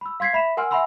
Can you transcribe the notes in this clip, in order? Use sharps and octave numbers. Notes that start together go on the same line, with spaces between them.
B5 E6
F5 C6 G#6 B6 C7
E5 B5 B6 E7
A#4 F#5 G#5 C6 E6 F6
E5 F#5 G#5 B5 C6 E6